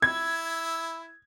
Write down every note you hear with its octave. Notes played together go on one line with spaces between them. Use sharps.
E4 E6 G#6